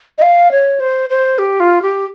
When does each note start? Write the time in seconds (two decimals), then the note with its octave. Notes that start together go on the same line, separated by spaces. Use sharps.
0.18 D#5
0.22 F5
0.51 C#5
0.80 C5
1.10 C5
1.39 G4
1.60 F4
1.82 G4